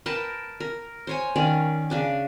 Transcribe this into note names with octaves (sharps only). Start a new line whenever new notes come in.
A#4 B4 G5 A5
A#4
C5 C#5 G#5
D#3 C#4 D5 F5
C#3 D4 D6